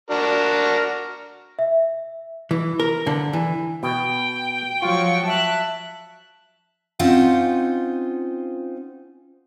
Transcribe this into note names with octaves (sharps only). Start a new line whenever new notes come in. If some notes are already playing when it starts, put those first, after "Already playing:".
D4 F#4 A#4
E5
E3
A#4
D3
E3
B2 G5
F3 F#3 F4 C#6
E5 A5 F#6
C4 C#4 D#4 F4 C5 F#5